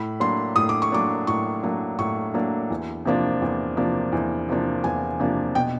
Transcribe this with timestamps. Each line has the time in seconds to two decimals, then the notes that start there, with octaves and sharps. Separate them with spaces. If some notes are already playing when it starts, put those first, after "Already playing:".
Already playing: A2 B5
0.20 F#3 A#3 D4 C6
0.56 A2 D#6
0.69 D6
0.82 C#6
0.92 F#3 A#3 D4 D6
1.27 A2 C#6
1.63 F#3 A#3 D4
1.99 A2 C#6
2.34 F#3 A#3 D4
2.70 E2
3.05 C3 F3 A#3 D4
3.42 E2
3.77 C3 F3 A#3 D4
4.13 E2
4.49 C3 F3 A#3 D4
4.84 E2 G#5
5.20 C3 F3 A#3 D4
5.55 B2 G5